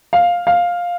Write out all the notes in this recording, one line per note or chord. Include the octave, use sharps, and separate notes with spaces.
F5
F5